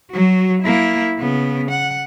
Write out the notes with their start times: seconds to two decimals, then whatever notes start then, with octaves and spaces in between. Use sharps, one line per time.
0.12 F#3 F#4
0.62 A#3 E4
1.19 C#3 B3
1.71 F#5